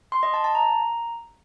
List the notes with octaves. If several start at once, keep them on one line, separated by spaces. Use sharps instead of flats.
C6
D#5
A5
A5
A#5